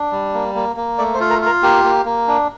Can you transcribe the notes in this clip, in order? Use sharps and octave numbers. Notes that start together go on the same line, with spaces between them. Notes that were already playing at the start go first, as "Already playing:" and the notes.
Already playing: D4
G3
A#3
A#3
A#3
A3 D5
C5
F4
A#4
F4 A#4
A#3 G4
A#3
A#3
D4